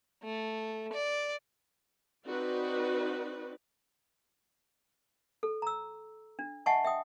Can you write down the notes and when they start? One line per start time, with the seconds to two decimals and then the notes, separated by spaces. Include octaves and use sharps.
0.23 A3
0.93 D5
2.27 C4 D#4 F#4 B4 D5
5.43 A4
5.62 A#5 E6
6.39 D4
6.66 D#5 E5 F#5 G#5 A5 C#6
6.84 E5 G5 D#6